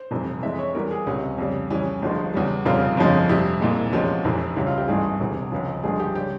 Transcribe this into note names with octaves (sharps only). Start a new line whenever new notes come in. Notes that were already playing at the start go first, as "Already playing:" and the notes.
Already playing: C5
F1 F2 E3 G3
F2 E3 G#3 E5
C#5
E2 E3 G3 A#4
G#4
C#2 C3 G3 C#4
F2 C#3 G3
F2 C#3 E3 G3 C#4
G1 G2 F3 G#3
E2 C#3 G3
F1 F2 C#3 G3 F4
G1 F2 C#3 F3 G#3
F2 C3 G3 E4
C2 A#2 G#3
E2 C3 F3 G#3 C#4
F1 F2 C3 E3
C#2 C#3 G3 E4
F4
G4
G#1 G2 E3 G#3 G#4
F1 E2 C3
C#2 C#3 F3
G1 G2 F3 G#3 G#4
G4
C#3 G3 G4